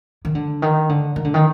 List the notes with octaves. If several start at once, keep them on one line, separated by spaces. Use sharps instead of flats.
D#3
D3
D#3
D3
D#3
D3
D#3